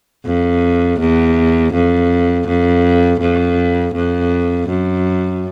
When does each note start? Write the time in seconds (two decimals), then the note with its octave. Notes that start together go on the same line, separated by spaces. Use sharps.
0.26 F2
1.00 E2
1.74 F2
2.48 F2
3.21 F2
3.95 F2
4.69 F#2